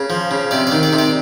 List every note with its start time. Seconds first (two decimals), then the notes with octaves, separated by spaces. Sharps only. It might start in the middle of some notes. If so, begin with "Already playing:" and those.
Already playing: C#3
0.10 F3
0.31 C#3
0.51 C3 D5
0.67 D#3 D5
0.83 D5
0.93 C3
0.98 D5